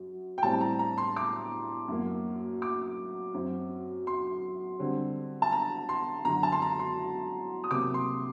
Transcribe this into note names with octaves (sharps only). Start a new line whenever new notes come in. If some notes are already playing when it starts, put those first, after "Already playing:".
Already playing: F#2 F#3
G5
A2 G3 C4 A5
A#5
A#5
C6
D6
F#2 F#3 A#3
D6
F#2 F#3 C4
C6
D3 G3 C4
A5
A#5
C6
F#2 D3 F#3 A#5
A5
C6
A#5
C6
D#6
C3 F#3 A#3 D6
C6